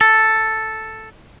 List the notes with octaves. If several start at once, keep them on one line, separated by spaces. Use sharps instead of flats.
A4